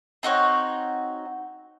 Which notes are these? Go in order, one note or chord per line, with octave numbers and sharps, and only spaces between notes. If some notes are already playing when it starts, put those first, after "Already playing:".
C4 D#4 F#4 C#5